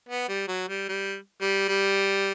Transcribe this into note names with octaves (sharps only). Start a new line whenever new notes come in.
B3
G3
F#3
G3
G3
G3
G3